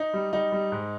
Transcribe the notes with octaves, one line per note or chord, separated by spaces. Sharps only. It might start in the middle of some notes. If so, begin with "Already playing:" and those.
Already playing: D#4
G3
G3 D#4
G3
G#2